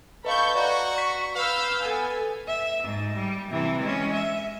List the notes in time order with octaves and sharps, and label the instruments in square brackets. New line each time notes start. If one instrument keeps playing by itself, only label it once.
[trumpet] A4 [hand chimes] B4 D#5 F5 [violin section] B5 C#6 G6
[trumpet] F#4 [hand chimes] D5 A#5 [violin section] C#6
[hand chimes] B6
[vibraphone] B4 B5 [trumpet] F5 [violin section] E6 G6
[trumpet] B3 [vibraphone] A4 B4 [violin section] G#5
[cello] E5
G#2
G3
C3 E3
G#3 C#4
E5